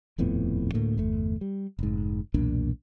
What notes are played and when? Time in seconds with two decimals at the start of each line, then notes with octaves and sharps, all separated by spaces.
0.18 D#1 F2 A2 B3
0.73 D2 A2 A3 A#3
0.98 G1 E2 A3
1.41 G3
1.79 F1 G#2
2.34 B1 E2 A#2 D4